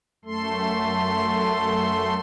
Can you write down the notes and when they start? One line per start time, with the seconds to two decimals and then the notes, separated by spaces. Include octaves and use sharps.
0.25 F#2 A3 A4 C6